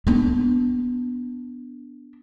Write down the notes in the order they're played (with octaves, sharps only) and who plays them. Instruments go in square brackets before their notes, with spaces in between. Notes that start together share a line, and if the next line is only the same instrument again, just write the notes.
[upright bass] B3 D4